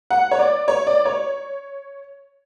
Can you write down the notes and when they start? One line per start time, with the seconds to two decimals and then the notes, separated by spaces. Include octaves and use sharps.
0.10 F#5
0.31 C#5
0.39 D5
0.68 C#5
0.87 D5
1.05 C#5